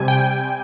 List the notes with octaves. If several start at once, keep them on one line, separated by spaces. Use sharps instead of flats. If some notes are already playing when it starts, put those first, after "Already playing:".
Already playing: C3 G3 G#5
G5